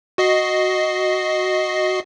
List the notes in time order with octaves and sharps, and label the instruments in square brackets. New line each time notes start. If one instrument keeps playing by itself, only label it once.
[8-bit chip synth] F#4 D#5 C7